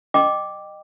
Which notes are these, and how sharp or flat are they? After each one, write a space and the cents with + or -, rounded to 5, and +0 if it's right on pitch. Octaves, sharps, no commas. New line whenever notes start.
D#5 -25 G5 +0 D6 +0